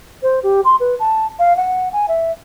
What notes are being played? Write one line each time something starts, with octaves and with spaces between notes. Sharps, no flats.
C5
G4
C6
B4
A5
F5
F#5
G#5
E5